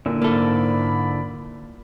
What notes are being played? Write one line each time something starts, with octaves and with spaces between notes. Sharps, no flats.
A#2 D3 E4
G#2 A#3 A4 D5 B5